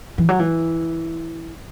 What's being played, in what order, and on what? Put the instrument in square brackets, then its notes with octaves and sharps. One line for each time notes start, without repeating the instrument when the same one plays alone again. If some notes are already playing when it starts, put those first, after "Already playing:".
[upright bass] E3
F#3
E3